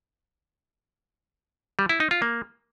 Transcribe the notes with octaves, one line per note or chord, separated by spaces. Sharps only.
G3
E4
D#4
F4
A#3